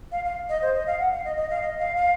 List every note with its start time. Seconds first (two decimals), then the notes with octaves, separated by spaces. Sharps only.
0.12 F5
0.25 F5
0.49 D#5
0.62 C5
0.74 D#5
0.87 F5
0.99 F#5
1.12 F5
1.25 D#5
1.37 D#5
1.50 F5
1.62 D#5
1.79 F5
1.96 F5